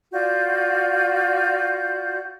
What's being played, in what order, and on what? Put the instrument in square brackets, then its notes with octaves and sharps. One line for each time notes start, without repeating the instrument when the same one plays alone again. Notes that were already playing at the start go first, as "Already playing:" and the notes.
[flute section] F4 F#4 D5 G6